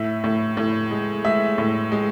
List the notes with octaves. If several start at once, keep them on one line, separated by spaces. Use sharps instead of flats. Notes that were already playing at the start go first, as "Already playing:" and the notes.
Already playing: A2 E5
A2
A2
G#3
G#3 E5
A2
G#3